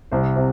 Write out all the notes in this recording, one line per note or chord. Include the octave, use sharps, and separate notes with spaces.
C2 C5
C3